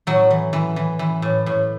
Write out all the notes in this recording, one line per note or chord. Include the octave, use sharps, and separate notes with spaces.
A2 F#3
E3
E3
E3
E3
A2
A2